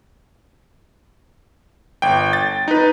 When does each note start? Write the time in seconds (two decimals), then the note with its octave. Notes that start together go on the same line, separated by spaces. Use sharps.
2.02 G1 G5
2.33 A6
2.68 D#4 B4